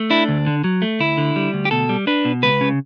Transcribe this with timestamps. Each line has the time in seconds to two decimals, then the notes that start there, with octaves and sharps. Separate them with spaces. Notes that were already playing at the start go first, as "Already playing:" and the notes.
Already playing: A3
0.10 D4 E4
0.28 D2
0.47 D3
0.64 F#3
0.82 A3
1.00 D2 E4
1.17 D3
1.36 G3
1.54 D2
1.65 G4
1.71 B2 A4
1.89 G3
2.07 D4 B4
2.25 B2
2.43 C#2 B4
2.61 C#3